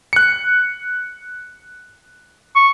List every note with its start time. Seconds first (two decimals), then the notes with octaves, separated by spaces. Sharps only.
0.13 F#6 C#7
2.56 C#6